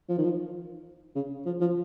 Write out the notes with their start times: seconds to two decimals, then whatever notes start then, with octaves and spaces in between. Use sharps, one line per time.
0.09 F3
0.18 D#3
0.24 F3
1.16 C#3
1.46 F3
1.61 F3